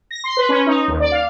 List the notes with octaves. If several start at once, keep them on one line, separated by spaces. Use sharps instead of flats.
A#6
C6
B4
C#4
D#4
D#2
D5
F5